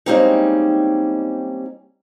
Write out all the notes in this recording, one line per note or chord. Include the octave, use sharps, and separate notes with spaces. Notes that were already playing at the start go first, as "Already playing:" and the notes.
G3 G#3 A#3 C4 C#4 D#4